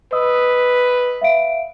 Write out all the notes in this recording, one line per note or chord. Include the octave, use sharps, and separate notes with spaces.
B4 D#5 D#6 E6
E5 F5 D7